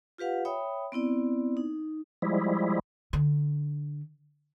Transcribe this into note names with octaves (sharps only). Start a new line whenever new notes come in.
F4 G4 B4 F5 F#5
C#5 E5 G5 B5 D#6
B3 C4 E4 D5
D#4
F3 G3 G#3 E4
D3